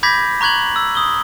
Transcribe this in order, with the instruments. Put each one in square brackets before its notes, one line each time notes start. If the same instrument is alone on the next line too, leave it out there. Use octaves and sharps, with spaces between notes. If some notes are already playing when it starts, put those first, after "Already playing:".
[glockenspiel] B5 D6 G6 G#6 A#6 B6
A#5 C#6 F#6 G#6 F#7
E6
D#6 G7